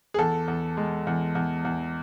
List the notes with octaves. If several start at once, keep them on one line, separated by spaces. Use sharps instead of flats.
G#4
E2 A4
E2
G#3
E2
E2
E2